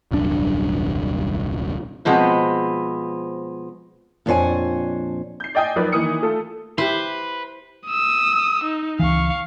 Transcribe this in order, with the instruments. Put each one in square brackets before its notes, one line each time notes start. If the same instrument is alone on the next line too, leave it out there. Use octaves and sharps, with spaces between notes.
[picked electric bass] D#1 C2 F#2 D4
[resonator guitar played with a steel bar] B2 F3 G#3 B3 C4
[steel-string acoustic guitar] F2 A#2 D4 C5 C#5 G#5
[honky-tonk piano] G6 C7
D5 D#5 G5 G#5 D#6
F3 F#3 D#4 A#4 B4 D5
D#3 E3 A#3 D#6 C#7
A3 F4 A4
[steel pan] E4 G4 [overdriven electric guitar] B4 [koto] C5
[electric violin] D#6 E6
D#4
[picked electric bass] C#2 E3 [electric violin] F5 C#6